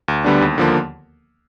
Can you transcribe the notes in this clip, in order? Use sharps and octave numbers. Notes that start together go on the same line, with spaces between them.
D2
D3 G3 B3 D4
D#2
D3 F3 A#3